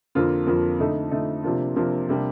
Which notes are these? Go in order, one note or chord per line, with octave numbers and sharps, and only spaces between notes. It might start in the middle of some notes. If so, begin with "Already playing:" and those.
F2 D3 F3 A#3 F4
F2 D3 F3 A#3 F4
D3 A3 D#4 A4
D3 A3 D#4 A4
C3 F3 A#3 D4 F4
C3 F3 A#3 D4 F4
C3 G3 A#3 D4